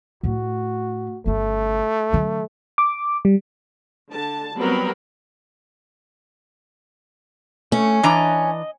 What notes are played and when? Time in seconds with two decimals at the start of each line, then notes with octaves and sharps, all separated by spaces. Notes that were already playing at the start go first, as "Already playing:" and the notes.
0.23 A2 A3 F#4
1.26 G1 C#3 A3
2.12 D3 F#3
2.78 D6
3.25 G3
4.13 D3 A5
4.57 F#3 G3 B3 C4 A#4 B5
7.72 A3 C#4
8.03 E3 D4 D#5 A#5